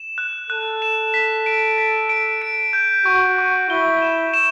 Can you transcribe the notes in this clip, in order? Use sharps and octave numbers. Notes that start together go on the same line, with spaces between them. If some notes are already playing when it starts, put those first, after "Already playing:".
Already playing: E7
F#6
A4 F#6
E7
B6
D7
B6
D7
D7
G6
F#4 C#6
C#6
E4 G7
E7
E7